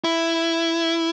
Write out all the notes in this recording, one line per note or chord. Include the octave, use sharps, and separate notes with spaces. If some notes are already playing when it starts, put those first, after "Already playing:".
E4